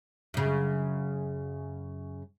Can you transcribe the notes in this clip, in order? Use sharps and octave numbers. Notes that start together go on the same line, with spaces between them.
F#2 C#3